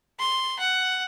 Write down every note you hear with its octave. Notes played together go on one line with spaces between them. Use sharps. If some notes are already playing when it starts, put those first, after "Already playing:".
C6
F#5